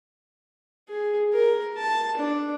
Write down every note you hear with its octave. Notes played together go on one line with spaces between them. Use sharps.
G#4
A#4
A5
D4